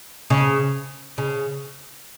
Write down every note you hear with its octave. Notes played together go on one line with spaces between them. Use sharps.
C#3
C#3